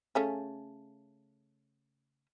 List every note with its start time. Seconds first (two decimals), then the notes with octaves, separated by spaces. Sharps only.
0.15 C#3 A3 C#4